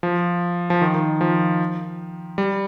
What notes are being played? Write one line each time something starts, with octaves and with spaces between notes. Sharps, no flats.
F3
F3
D#3
D#3
F3
G3